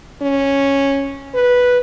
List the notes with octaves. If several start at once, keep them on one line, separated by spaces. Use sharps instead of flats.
C#4
B4